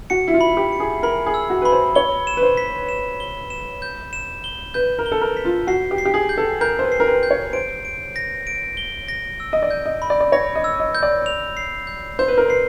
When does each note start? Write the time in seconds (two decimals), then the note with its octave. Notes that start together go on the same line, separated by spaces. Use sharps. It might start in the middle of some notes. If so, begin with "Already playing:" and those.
0.10 F#4 C#7
0.28 E4
0.34 F4
0.41 B5
0.57 G4
0.72 C#7
0.80 G#4
1.03 A#4 B5
1.26 G#4
1.34 E6
1.50 F#4
1.62 B4 B5
1.72 C5
1.95 C#5 G7
2.27 E7
2.37 B4
2.43 C5
2.57 B6
2.89 E7
3.20 G7
3.50 E7
3.82 G6
4.13 E7
4.44 G7
4.74 B4 G6
4.99 A#4
5.06 G7
5.12 A4
5.21 A#4
5.37 B6
5.45 F4
5.67 F#4 C7
5.91 G4
5.98 C7
6.05 G4
6.14 G#4
6.29 G6
6.38 A4
6.61 A#4 G6
6.79 C5
6.84 B4
6.92 C7
7.00 A#4
7.07 B4
7.23 G6
7.31 C#5
7.53 C5 D7
7.85 D7
8.16 A#6
8.47 D7
8.77 G7
9.08 A#6
9.40 E6
9.53 D#5
9.62 D5
9.71 G6
9.86 D#5
10.02 B5
10.10 D5
10.21 D5
10.32 C#5 A#6
10.55 D#5
10.64 E6
10.80 D#5
10.95 G6
11.03 D5
11.26 F7
11.57 C7
11.87 G6
12.19 C5 G6
12.28 B4
12.38 A#4
12.48 B4 C7